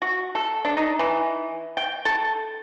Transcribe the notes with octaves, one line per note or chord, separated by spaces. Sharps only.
F#4
A4
D4
D#4
E3
G5
A4